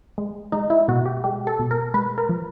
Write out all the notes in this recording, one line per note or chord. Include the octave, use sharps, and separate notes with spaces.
G#3
G#3 D#4
E4
B2 F#4
G4
G#3 G4
A4
B2
A#4
G#3 B4
A#4
F3